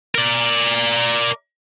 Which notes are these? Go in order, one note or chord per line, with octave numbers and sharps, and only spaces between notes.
A#4 D5